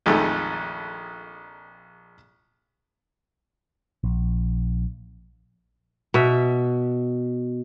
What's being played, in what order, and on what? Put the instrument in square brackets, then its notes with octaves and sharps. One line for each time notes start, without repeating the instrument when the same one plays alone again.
[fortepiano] A#1 F2 D#3 G#3 A3
[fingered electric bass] A#1
[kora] B2 E5